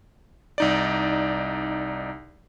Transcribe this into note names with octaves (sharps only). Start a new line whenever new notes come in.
C2 D#4 D5